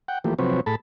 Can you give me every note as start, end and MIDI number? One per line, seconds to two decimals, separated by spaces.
0.08 0.18 78
0.08 0.18 79
0.24 0.34 52
0.24 0.34 53
0.24 0.34 57
0.24 0.34 58
0.24 0.34 67
0.39 0.61 48
0.39 0.61 53
0.39 0.61 54
0.39 0.61 60
0.39 0.61 71
0.39 0.61 73
0.66 0.75 45
0.66 0.75 68
0.66 0.75 69
0.66 0.75 81
0.66 0.75 83